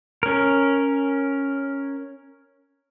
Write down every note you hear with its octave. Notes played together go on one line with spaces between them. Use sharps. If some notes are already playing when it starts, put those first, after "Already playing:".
C#4 A#4